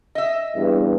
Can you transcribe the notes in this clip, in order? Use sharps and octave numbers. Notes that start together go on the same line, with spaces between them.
D#5 E5
E2 G2